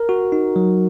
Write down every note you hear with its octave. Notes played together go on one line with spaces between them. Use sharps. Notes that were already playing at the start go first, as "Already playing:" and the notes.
Already playing: A#4
F#4
D#4
F#3